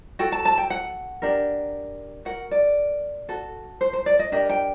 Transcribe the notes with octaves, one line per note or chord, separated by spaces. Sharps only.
F#4 A4 G5
A5
A5
G5
F#5
D4 G4 A#4
F#4 A#4 F#5
D5
F#4 A4
C5
C5
D5
D#5
D4 G4 A#4 D#5
G5